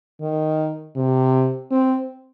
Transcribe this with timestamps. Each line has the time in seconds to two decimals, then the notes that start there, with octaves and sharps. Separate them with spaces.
0.21 D#3
0.96 C3
1.71 C4